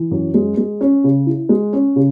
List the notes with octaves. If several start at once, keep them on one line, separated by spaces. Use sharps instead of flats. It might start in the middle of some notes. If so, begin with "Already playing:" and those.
Already playing: E3
F#2
G#3
G#3
C#4
C#3
E4
G#3
C#4
C#3